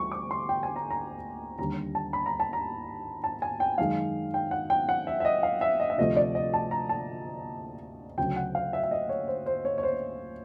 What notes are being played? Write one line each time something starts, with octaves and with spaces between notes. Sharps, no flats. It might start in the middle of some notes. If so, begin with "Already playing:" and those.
Already playing: D2 E3 G3 C#6
D6
C6
G5
G#5
A#5
A#5
D#2 D3 G3 A#5
A5
B5
A#5
A5
A#5
A5
G#5
G5
F#2 D#3 G#3 F5
G5
F#5
G5
F#5
E5
E5
D#5
F5
E5
D#5
E5
D2 C3 F3 A3 D#5
D5
D#5
A5
A#5
A5
D2 C#3 F#3 G5
F#5
F5
E5
E5
D#5
C#5
C5
C5
C#5
C#5
C5